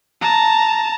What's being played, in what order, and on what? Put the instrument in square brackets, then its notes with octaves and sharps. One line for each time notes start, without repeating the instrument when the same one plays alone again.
[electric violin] A5 A#5